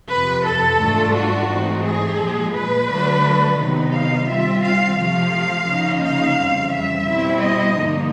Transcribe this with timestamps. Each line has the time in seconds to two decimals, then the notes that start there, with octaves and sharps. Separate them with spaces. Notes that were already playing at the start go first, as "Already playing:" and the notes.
0.09 F2 C3 F3 B4
0.45 A4
0.80 G#2 E3 A3 D4 F4
1.15 F#4
1.50 G#2 E3 A3 C4 D#4
1.84 G#4
2.19 A#2 F3 G#3
2.54 B4
2.89 D3 F#3 A3 D4
3.59 C3 D#3 F#3 B3 D#4
3.93 F5
4.29 D#3 G3 C4 F4 E5
4.64 F5
4.98 C3 F3 A3 F5
5.67 C#3 F3 A#3 D#4
6.03 F5
6.38 F2 C#3 E3 G3 C4
6.73 E5
7.07 B2 G3 C4 E4
7.42 D#5
7.77 G2 D3 F3 A#3 D#4